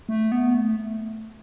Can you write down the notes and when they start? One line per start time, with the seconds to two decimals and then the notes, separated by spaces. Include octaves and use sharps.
0.09 A3
0.32 B3
0.55 A3